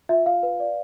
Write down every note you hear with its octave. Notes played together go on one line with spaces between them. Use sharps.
F4 E5
F4 F5
B4
D5